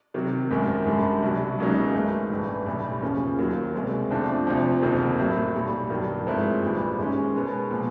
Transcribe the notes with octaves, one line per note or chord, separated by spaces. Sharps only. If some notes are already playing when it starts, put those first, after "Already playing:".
C3 D#3 F#3
G#1 F#2 D#3
G#1 F#2 D3 G3
C2 B2 F#3
C#2 C#3 F#3 A#3 D#4
G#2 E3 A3
A1 G2 E3 A3
B1 A2 E3 G3
E2 C#3 F3 A#3 C#4
D#2 D#3 F#3
C2 B2 G#3 C4
F2 D3 F3 A3 D4
D2 C3 F3
F#1 F2 C3 D#3
A2 F#3 A3
B1 A#2 G3
G2 D#3 F#3
G#2 F3 A3 C4 E4
A#1 G#2 E3 G3
G#2 D#3 G#3 C#4
B2 G#3 B3
A#2 F3